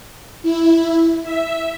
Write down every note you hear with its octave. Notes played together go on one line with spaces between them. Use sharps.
E4
E5